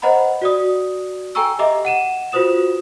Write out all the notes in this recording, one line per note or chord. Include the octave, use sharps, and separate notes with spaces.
B4 C5 D#5 F#5 A#5 B5
F#4 D5 D#6
A4 G5 G#5 A#5 C#6 E6
G4 D#5 E5 A#5 D6
F#5 D#7 E7
F4 F#4 B4 C5 D#6 E7